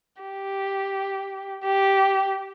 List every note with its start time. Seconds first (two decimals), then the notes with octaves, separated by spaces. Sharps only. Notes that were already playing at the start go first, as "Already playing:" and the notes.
0.22 G4
1.64 G4